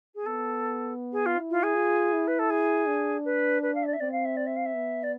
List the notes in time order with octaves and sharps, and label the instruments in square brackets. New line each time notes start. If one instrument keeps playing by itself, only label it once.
[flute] G#4
[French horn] B3 [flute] A4
[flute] G#4
F4
[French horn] E4
[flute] F4
G#4
[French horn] F4
E4
[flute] B4
A4
G#4
[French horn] D4
[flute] B4
B4
F5
E5
D5
E5
[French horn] C4 [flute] D5
[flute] F5
E5
D5
E5
F5
E5
[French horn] B3
[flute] D5